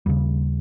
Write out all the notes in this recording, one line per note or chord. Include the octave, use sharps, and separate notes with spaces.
D#2 C#3 G3